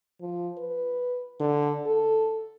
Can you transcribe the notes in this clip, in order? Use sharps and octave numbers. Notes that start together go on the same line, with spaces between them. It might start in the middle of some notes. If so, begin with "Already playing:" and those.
F3
B4
D3
A4